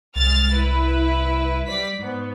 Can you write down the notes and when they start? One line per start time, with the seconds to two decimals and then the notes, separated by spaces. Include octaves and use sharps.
0.16 C2 G#3 F6 A6
0.54 E4 B4
1.67 G3 D5 B6
1.97 G#2 B3